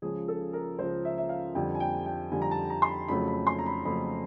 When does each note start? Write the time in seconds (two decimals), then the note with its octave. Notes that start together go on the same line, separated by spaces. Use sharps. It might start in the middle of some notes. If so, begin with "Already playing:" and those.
0.02 C#2 C#3 F3 G#4
0.28 A4
0.53 A#4
0.79 C#2 C#3 F3 C5
1.05 E5
1.18 E5
1.29 F5
1.55 F2 D3 G3 G5
1.75 G#5
1.80 G5
2.06 G5
2.32 F2 D3 G3 G#5
2.42 A#5
2.51 A5
2.70 A#5
2.82 C6
2.89 B5
3.08 F2 C#3 F#3 A3 B5
3.28 B5
3.47 C6
3.59 A#5
3.66 B5
3.85 F2 C#3 F#3 A3 B5